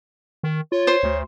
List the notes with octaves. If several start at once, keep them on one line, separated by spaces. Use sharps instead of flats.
D#3
F4 C#5
C5 C6
D2